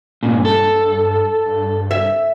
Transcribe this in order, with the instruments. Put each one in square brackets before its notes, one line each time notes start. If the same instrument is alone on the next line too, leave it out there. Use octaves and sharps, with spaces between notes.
[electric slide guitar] G2 A#2 [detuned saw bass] C#4
[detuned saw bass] G2 [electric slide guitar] A4
[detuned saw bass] G2
[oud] E5